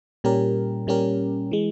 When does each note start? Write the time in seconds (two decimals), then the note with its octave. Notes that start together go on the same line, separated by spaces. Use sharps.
0.24 A#2 G3 C#4 G4 A#4
0.87 A#2 G3 C#4 G4 A#4
1.51 E3 G#3